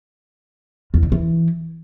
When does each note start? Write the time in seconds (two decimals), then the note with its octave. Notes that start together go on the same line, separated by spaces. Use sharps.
0.94 E2
1.03 D3
1.12 E3